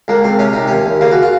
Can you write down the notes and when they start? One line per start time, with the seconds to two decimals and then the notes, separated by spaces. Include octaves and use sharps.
0.08 C#2 A#3
0.24 C#2 C4
0.39 C3 C#4
0.53 C3 D#4
0.67 D#2 C#4
0.86 D#2
1.01 C#3 A#3
1.11 F#4
1.22 F4